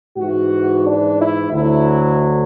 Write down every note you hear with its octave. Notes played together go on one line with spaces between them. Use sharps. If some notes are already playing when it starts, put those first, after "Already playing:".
G#2 E3 F#4
D4
E4
D2 D3 F#3 E4